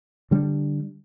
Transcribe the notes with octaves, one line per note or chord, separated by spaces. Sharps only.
D3 G3 D4